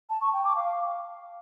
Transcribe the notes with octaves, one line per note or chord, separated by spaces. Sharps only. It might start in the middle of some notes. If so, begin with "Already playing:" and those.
A5
C#6
G5
D6
F5